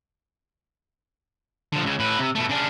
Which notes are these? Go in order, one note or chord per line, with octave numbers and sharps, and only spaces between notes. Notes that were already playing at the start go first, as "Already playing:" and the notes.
D3 F3
C#2 C#3
A2 B4
C3
B2 A3
C#3 D4